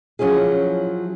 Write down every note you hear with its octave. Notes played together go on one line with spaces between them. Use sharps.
F3 F#3 C#4 E4 G#4